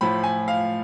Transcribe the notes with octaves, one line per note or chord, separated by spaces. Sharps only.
A2 F3 B5
G#5
F5